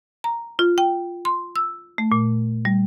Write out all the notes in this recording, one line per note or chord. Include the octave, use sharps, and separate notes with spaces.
A#5
F4
G5
C6
E6
A3
A#2
G3